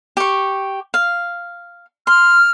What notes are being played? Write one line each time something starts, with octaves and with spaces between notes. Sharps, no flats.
G4 C#6
F5
C6 F6